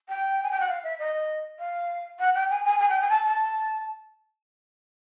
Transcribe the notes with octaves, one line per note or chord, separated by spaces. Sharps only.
G5
G#5
G5
F#5
F5
E5
D#5
F5
F#5
G5
G#5
G#5
G#5
G5
G#5
A5
A5